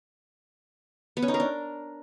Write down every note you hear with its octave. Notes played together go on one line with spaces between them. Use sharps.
B3
C#4
D#4
A#4
D4